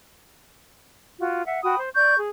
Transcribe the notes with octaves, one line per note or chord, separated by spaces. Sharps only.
F4 F#4
E5 F#5
F#4 G5 B5 D#6
C5
D5 C#6 G6
G#4